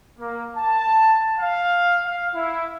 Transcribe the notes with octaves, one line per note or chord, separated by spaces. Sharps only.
A#3
A5
F5
F5
E4